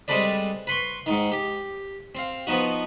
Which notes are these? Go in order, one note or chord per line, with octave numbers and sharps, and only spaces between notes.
G3 G#3 C4 A4 B4 D5
B4 C6 C#6
G#2 D#3
G4
C4 F5
F3 B3 D#4 F#4